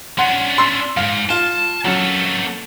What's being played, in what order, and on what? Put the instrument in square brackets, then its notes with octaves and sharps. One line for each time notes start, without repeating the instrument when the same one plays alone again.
[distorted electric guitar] C#4 D4 [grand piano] F#5 C6
[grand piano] C6 E6 C7
[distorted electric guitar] F2 G#2 [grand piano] F5
[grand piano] F4 G7 [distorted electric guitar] A5
[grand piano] F#3 C#4 [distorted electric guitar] A#3 A4